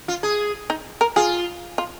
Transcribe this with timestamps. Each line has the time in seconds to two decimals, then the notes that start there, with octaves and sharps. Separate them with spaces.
0.08 F4
0.23 G#4
0.70 D#4
1.01 A#4
1.16 F4 G#4
1.78 F4